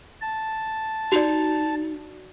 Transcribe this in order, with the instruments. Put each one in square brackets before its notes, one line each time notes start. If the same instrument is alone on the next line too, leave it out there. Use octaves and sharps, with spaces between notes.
[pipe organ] A5
[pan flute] D#4 [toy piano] F#4 D5